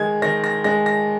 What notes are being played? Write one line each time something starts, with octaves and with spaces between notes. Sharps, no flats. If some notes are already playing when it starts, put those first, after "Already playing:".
Already playing: D#3 G#3 G#6
D#3 A#6
A#6
G#3 A#6
A#6